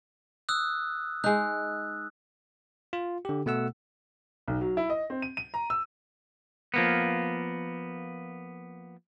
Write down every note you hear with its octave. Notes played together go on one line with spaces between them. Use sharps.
D#6 E6 F#6
G#3 D#4 F#6
F4
D3 G4
B2 A3 F#5 E6
B1
F#3
E4
D#5
C4
D#7
D#7
A#5
E6
F3 A#3 B3